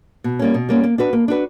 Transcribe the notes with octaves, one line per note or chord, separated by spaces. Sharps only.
B2
G3 A#3 C#4
B2
G3 A#3 C#4
A#3
D4 F#4 B4
A#3
D4 F#4 B4